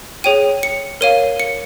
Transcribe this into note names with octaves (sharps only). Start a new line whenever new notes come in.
G#4 C#5 G5 D#7
C#7
A#4 C#5 F5 D#7
C#7